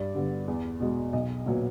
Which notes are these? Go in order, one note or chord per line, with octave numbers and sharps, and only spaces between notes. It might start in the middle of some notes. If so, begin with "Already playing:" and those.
Already playing: G2 D5
D3 G3 B3
E2
B2 G#3
B1 D#5
A#2 F#3 B3